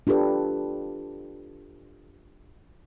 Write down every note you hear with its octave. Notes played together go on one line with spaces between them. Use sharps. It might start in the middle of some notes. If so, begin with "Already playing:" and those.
D4 F4 G4 A4 B4